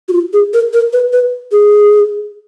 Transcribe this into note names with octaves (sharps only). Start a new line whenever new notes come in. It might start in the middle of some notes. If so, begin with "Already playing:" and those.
F#4
F4
G#4
A#4
A#4
B4
B4
G#4